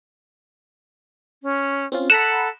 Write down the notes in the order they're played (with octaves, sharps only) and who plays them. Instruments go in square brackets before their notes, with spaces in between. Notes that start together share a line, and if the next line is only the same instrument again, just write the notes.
[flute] C#4
[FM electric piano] C4 C#4 F4
[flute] A4 [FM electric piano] F#5 A#5 B5 [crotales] E7